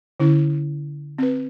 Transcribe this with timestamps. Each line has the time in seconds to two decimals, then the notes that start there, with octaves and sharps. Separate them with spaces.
0.20 D3 C#4 E4
1.18 C4 B4